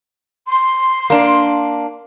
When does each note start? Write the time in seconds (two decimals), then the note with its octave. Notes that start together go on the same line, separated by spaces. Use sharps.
0.47 C6
1.10 A#3 D4